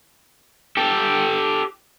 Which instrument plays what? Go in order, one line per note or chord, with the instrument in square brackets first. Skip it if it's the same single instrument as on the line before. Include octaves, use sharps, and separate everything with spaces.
[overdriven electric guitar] G4 A4